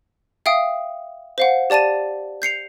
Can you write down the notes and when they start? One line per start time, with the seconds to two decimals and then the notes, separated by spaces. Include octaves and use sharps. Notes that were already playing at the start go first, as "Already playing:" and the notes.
0.46 E5 F5 G5 D#6 D7
1.38 C5 F5 F#5
1.70 G4 D5 A5 A6 D#7
2.42 G6 C7 C#7 F7